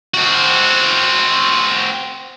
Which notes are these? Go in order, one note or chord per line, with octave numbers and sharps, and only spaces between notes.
C4 F#4